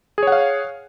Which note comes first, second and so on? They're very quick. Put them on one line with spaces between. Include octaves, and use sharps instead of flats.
G#4 C#5 F#5 F5